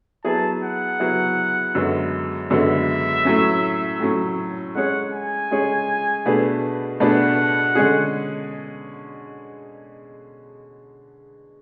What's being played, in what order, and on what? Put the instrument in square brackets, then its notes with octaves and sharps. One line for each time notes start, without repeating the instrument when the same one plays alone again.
[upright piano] F#3 B3 E4 G#4 [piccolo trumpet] A5
[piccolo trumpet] F#5
[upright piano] F#3 B3 E4 G#4
F#2 D3 G#3 B3 F#4
[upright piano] F#2 D3 G#3 B3 F#4 [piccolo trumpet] E5
[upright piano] A2 F#3 C#4
A2 F#3 C#4
[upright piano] G#3 C#4 G#4 C#5 [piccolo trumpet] F#5
[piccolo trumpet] G#5
[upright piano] G#3 C#4 G#4 C#5
B2 A3 D4 G#4 B4
[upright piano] B2 A3 D4 G#4 B4 [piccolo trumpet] F#5
[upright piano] D3 G#3 C#4 G#4